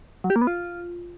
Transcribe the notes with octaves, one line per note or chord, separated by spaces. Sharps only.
F#3
G4
A#3
B3
F4